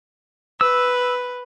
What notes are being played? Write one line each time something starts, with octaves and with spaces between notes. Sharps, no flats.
B4 E6